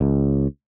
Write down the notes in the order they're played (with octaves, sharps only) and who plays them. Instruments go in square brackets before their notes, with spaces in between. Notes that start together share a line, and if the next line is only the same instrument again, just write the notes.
[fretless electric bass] C#2